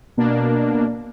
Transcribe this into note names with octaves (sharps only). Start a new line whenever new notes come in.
B2 A#3 D4